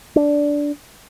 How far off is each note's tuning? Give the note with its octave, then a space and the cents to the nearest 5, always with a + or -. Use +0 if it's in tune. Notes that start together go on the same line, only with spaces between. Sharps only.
D4 -10